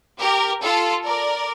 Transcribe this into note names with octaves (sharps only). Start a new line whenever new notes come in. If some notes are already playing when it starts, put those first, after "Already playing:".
G4 A#4
F4 A4
A#4 D5